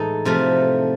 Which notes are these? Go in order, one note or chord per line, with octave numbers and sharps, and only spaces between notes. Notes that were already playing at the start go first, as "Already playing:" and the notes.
Already playing: A2 E3 G#3 D#4 A4
C3 F3 A3